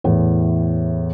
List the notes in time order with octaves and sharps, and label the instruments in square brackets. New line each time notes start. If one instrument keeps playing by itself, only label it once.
[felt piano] E2 A2 E3